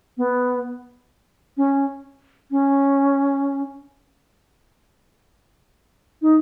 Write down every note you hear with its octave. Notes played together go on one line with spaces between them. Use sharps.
B3
C#4
C#4
D#4